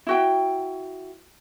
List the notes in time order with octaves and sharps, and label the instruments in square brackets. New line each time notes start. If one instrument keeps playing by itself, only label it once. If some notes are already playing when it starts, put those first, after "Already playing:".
[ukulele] E4 F#4 G5